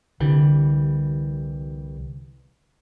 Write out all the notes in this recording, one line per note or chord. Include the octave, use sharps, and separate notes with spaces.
C2 D3 E3 G3